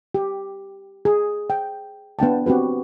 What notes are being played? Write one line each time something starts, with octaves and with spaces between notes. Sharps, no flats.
G4
G#4
G5
B3 D4 G5 A5
C4 F#4 G4 B4